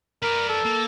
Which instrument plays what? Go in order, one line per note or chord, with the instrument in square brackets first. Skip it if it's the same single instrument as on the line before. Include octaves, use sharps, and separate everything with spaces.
[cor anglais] A#4 [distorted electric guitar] B4 D5
[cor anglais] A4
[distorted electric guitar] A#3